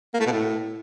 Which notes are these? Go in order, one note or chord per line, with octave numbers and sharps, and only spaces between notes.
A#3
A3
B2
A2